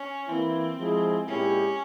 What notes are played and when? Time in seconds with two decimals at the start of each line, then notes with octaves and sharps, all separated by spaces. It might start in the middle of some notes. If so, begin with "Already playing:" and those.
Already playing: C#4
0.28 E3 A#3 C4 E4
0.78 F3 G#3 E4 G#4 C5
1.27 A#2 G#3 C#4 E4 G4